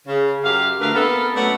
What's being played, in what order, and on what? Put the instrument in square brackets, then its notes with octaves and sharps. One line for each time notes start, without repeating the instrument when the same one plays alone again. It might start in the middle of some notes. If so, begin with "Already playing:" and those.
[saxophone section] C#3
F#2 G4 F5
D2 D3 A3 A#4 B4 F5
C3 A#3 B3 A4
F#2 A3 B3 C#4 D5 F#5